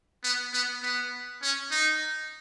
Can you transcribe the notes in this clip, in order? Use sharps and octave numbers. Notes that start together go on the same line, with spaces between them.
B3
B3
B3
C#4
D#4